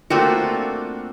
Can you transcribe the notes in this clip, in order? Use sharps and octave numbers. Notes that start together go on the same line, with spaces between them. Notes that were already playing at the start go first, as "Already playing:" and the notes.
A3 A#3 C4 D4 F4 F#4